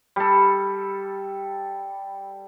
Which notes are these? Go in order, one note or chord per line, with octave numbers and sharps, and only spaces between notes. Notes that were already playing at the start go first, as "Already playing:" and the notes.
G3 A4